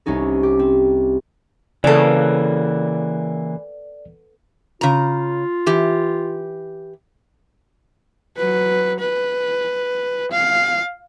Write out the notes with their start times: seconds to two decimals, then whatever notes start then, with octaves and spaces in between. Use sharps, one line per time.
0.06 C2 C#4 D#4 A4
0.43 G4
0.59 C4
1.84 C#3 E3 A#3 B3 A4 D5
4.81 C#3 F4 A#5
5.66 E3 G4
8.37 F#3 B4
8.99 B4
10.32 F5